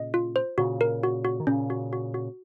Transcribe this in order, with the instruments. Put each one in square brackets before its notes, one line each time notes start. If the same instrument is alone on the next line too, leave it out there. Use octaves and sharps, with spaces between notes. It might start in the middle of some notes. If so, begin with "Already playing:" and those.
Already playing: [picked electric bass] A#2 C#3 [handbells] D#5
[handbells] F4
C5
[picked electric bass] A#2 C#3 [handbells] F#4
[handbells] A#4
F#4
F#4
[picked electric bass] D#3
[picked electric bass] A#2 C#3 [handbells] C#4
[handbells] F#4
F#4
F#4